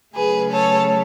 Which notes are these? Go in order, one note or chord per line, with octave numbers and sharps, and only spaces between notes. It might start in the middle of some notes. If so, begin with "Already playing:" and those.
C#3 F#3 A3 G#4 B4
A4 C#5